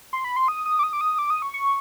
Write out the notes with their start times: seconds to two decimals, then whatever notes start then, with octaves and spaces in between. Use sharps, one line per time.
0.13 C6
0.24 B5
0.36 C6
0.48 D#6
0.66 D#6
0.79 D6
0.83 D#6
0.93 D6
1.01 D#6
1.19 D6
1.30 D#6
1.42 C#6
1.54 C#6